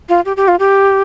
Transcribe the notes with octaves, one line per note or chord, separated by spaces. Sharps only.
F4
G4
G4
F4
G4